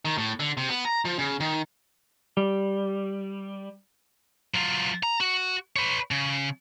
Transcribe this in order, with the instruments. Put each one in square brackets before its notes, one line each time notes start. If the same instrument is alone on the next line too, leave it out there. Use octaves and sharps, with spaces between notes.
[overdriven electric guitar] D#3
A2
D3
C3
B3
A#5
F3
C#3
D#3
[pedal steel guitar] G3
[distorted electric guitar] F#3 F4
A#5
F#4
B4 C#5
C#3